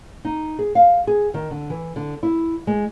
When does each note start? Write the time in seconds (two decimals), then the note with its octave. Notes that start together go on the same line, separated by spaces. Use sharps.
0.25 D#4
0.59 G#4
0.75 F5
1.07 G#4
1.34 D#3
1.51 D3
1.70 E3
1.96 D3
2.23 E4
2.67 G#3